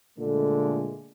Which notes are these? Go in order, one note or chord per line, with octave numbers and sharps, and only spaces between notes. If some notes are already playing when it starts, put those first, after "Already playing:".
A#2 D3 G#3 A3